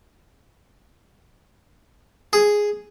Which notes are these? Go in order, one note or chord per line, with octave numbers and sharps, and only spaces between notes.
G#4